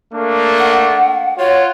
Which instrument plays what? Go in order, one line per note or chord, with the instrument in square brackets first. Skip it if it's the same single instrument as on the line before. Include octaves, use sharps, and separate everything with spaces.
[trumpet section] A3 A#3 D4
[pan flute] F#5
[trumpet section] F4 F#4 [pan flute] C#5